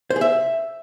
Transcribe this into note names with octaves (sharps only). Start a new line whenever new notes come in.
C5
G#4
E5